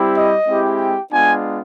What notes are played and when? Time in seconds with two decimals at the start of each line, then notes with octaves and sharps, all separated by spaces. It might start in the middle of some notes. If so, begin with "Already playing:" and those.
Already playing: G3 C4 E4 G4
0.16 D#5
0.47 G#3 C4 E4 G4
0.79 G5
1.11 G#3 B3 D4 F4 G#5